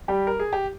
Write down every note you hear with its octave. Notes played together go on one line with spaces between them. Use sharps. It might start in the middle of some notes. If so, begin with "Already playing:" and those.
G3 G4
A#4
G#4
G4